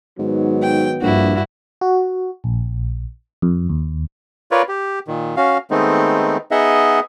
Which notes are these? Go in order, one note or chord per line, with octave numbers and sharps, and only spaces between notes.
G#2 D#3 F#3 B3
G5
A#1 G2 E4 F#4
F#4
A#1
F2
D#2
F4 A#4 B4 C#5 D5
G4
A#2 D#3
C#4 F#4 F5
D#3 G#3 A3 B3 C4 D#4
B3 D#4 G#4 D#5 E5 F#5